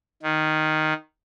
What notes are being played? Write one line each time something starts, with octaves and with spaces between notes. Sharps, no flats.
D#3